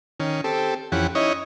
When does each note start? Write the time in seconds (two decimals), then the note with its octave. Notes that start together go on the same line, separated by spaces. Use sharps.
0.20 D#3 C#4
0.44 C4 G4 A4
0.92 F2 E3 C#4 G4 F#5
1.15 C#4 D#4 E4 C#5 D#5